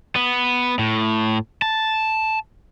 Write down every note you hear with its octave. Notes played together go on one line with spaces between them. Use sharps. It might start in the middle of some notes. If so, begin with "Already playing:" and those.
B3
A2
A5